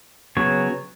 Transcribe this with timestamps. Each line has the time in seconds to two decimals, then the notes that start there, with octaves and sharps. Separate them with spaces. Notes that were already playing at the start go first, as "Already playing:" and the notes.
0.37 C#3 F#3 B3 C#5